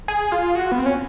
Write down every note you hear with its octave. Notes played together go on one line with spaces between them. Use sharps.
G#4
F4
F#4
B3
C4
C#4